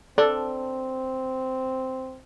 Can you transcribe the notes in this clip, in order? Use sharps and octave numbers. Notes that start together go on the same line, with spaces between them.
C4 D4 A4